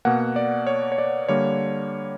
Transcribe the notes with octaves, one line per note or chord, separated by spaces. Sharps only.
B2 A#3 F#5
D5
C#5
C#5
D5
D3 G3 A#3 C#5